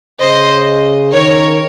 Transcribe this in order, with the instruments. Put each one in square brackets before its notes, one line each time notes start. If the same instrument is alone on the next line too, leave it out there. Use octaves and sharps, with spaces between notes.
[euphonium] C#3 [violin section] C5 D#5
[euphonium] D#3 [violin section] A#4 C#5